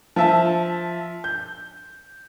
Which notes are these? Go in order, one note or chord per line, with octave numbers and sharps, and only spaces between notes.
F3 E5 A5
G6